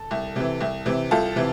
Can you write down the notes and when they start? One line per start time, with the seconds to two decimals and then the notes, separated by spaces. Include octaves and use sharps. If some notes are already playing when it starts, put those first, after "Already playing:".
Already playing: A4
0.11 C2
0.36 C3 E3
0.61 C2
0.86 C3 E3
1.11 C2 F4 A4
1.36 C3 E3